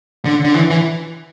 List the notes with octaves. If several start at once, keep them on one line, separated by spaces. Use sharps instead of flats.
D3
D3
E3
E3